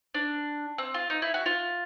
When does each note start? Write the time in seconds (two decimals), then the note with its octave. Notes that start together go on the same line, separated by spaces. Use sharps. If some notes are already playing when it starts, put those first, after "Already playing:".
0.14 D4
0.78 C4
0.94 F4
1.10 D#4
1.22 E4
1.34 F#4
1.46 F4